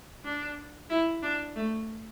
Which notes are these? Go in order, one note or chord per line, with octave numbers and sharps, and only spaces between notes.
D4
E4
D4
A3